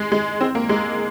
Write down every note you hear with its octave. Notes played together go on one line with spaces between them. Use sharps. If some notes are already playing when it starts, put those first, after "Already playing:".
Already playing: G#3
G#3
C4
A#3
G#3